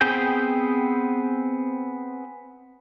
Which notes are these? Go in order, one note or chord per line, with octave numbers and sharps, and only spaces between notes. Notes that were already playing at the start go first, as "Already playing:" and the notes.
B3 C4 G#4 G5 G6